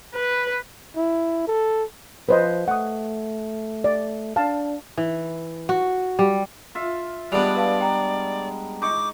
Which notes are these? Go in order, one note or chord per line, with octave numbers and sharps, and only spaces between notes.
B4
E4
A4
F3 B4 C5 D#5
A3 F#5 D#6
D5
D4 F5 A5
E3
F#4
G3
F4 E5
G3 G#3 B3 D4 D5 F7
B4 F5 A5
G5 A#5
D#4 C#6 D6